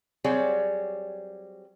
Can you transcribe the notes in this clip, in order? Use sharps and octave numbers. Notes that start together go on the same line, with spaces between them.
F#3 G3 C4 G#4 C#5 D5